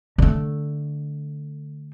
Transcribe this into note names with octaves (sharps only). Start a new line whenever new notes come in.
D3 A3